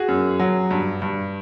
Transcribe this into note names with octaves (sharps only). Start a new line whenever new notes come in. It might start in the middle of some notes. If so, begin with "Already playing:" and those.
Already playing: F#4 G#4
F#2
F#3
G2
G2